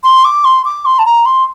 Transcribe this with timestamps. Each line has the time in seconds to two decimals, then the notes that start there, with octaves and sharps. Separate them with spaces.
0.04 C6
0.25 D6
0.45 C6
0.65 D6
0.85 C6
0.99 A5
1.05 A#5
1.26 C6